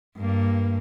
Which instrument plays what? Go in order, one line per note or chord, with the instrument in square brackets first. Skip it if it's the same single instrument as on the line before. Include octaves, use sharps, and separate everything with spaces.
[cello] G2 A#3